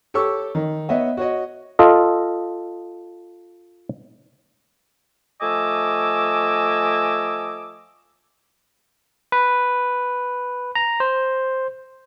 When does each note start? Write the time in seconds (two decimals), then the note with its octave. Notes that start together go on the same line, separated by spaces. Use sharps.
0.14 G4 A4 C#5 C#6 E6
0.55 D#3
0.89 B3 C#5 D#5 E5
1.17 F#4 C#5 D#5
1.79 F4 A4 D#5
5.41 F3 A3 D#5 G#5 D6 E6
9.32 B4
10.75 A#5
11.00 C5